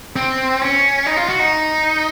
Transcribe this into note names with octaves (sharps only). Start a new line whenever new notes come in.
C4
C#4
D#4
F4
F#4
D#4